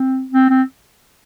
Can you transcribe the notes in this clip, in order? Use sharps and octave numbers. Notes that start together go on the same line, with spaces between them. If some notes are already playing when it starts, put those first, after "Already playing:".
Already playing: C4
C4
C4